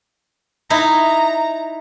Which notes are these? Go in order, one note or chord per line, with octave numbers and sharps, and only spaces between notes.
D#4 E4 A#5